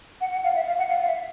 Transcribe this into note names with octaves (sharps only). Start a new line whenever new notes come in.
F#5
F#5
F5
E5
F5
F#5
F5
F5
E5